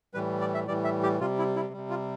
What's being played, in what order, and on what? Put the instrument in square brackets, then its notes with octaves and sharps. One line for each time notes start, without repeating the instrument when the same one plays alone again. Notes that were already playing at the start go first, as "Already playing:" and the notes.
[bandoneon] A2 E3 G3 B4
D5
E5
A2 E3 G3 D5
E5
G4
C3 G3 F4
E4
E4
C3 G3
F4